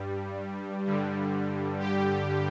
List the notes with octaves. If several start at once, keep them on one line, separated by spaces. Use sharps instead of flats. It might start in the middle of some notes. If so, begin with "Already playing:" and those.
Already playing: G2 G3
G2 D3 G3
G4